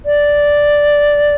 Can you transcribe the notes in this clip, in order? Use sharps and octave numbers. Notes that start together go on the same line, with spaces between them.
D5